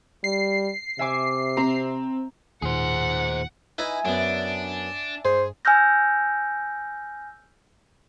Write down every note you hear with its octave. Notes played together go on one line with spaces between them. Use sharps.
G3 C7
C3 E5 G#5 D6
C4 A#5
D#2 A#2 G#4 C5 F#5
D#4 E4 B4 E5 G#5
F#2 B3 D4
G2 G#4 C5
G#5 E6 F6 G6 A#6